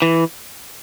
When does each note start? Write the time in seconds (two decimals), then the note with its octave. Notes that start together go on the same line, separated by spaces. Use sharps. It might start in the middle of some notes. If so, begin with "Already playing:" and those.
0.02 E3